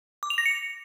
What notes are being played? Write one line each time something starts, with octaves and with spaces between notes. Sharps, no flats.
D6
F7
A#6
C#7